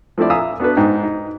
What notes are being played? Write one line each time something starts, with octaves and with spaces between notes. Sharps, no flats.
F3 A3 C4 E4 D5
E5 F5 G#5 A#5 D#6 E6
B3 D4 F#4 A4 B4
G#2 D#4 G5
D#4